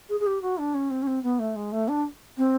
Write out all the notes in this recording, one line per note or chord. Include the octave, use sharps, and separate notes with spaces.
G#4
G#4
G4
F#4
D4
C#4
C4
C#4
C4
B3
A3
G#3
A3
D4
C4